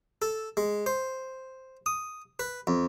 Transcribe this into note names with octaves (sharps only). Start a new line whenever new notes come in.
A4
G#3
C5
D#6
B4
F2